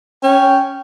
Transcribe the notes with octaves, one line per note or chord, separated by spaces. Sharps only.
C#4 G5